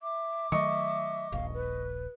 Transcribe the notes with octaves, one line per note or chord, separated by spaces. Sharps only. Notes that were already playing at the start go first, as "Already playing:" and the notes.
E5 D6
D#3 F#3 A3 D#5 E5 C#6 C#7
D#1 A#1 F5
B4